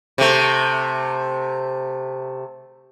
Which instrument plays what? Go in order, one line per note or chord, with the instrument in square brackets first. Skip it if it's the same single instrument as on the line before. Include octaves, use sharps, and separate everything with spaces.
[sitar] C3 A3